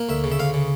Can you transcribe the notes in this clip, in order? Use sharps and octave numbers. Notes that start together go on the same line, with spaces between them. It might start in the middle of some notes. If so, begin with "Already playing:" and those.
Already playing: A#3
D2 E5
C#3
E5
D2 F5
C#3